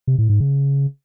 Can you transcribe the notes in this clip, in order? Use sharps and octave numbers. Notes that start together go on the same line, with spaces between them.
C3
A2
G#2
C#3